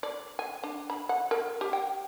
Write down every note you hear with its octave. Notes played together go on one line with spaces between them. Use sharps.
D5
G#5
D4
B5
F#5
A#4
G4
G5